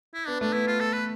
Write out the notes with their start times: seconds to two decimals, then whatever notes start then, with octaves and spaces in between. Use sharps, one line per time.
0.14 E4
0.28 B3 D4
0.41 A3 D4
0.53 B3 E4
0.67 F4
0.80 A4
0.93 B4